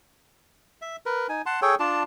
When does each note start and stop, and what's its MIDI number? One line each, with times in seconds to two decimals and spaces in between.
0.82 0.96 76
1.06 1.27 70
1.06 1.27 71
1.29 1.42 63
1.29 1.42 80
1.46 1.60 78
1.46 1.60 81
1.46 1.60 84
1.62 1.75 68
1.62 1.75 69
1.62 1.75 73
1.62 1.75 79
1.80 2.03 62
1.80 2.03 65
1.80 2.03 74
1.80 2.03 81